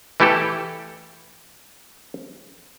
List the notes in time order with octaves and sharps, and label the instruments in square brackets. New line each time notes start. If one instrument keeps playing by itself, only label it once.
[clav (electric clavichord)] E3 A3 E4 G4 A4